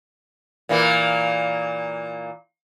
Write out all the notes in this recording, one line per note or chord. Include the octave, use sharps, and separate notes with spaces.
A#2 E3 A#3